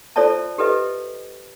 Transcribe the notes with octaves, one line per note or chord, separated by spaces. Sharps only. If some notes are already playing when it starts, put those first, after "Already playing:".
F4 A4 C5 D5 E5 A5
G4 A4 B4 D#5 E5